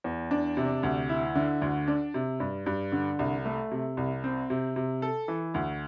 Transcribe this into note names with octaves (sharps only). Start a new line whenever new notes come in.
E2
D4
C3
D2
E4
D3
D2
D4
C3
G2
G2
D3
C2
A3
C3
C2
C4
C3
C3
A4
E3
D2